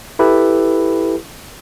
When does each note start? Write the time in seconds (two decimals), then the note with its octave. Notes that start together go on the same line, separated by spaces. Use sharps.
0.19 E4 G4 A4 B4